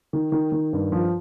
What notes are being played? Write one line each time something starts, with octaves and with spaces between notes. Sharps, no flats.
D#3
D#3
D#3
G2
F3